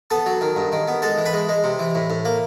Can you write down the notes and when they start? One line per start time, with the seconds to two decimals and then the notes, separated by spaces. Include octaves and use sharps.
0.11 B3 A4 A5
0.26 F#3
0.41 D#3
0.56 G2
0.72 D#3
0.88 B3
1.02 G#3 A4 A5
1.18 E3
1.25 B4 B5
1.33 G#3
1.49 G#3
1.64 C3
1.79 E3
1.95 A2
2.10 A2
2.25 A#3